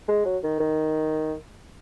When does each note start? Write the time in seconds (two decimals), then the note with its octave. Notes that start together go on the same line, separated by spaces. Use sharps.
0.08 G#3
0.25 F#3
0.43 D#3
0.60 D#3